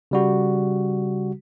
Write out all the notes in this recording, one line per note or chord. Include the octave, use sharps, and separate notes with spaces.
C#3 G3 F#4